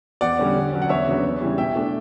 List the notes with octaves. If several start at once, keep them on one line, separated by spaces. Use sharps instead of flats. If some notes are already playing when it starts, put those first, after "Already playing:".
E2 D5 F#5
D3 G3 C#4
D3
F#3 C#4
F#5
E2 C#5 E5
C#3 F#3 B3 D4
E2
C#3 E3 G3
B2 E5 G5
A3 D4